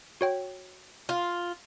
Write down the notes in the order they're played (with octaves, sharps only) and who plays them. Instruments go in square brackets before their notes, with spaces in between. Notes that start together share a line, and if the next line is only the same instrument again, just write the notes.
[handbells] F#4 C#5 G5
[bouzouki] F4